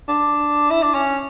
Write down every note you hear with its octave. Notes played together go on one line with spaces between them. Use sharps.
D4
E4
D4
C#4